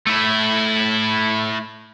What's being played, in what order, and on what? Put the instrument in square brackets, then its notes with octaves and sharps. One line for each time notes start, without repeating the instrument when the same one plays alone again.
[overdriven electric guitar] A3 E4